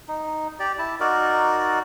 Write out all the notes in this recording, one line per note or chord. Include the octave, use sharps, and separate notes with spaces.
D#4
G4 D5
E4 A5
D#4 F#4 A#4 D5